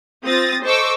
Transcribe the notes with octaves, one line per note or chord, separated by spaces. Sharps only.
C4 F4 D#6 A6 A#6
A4 C5 D#5 C#6 D6 E6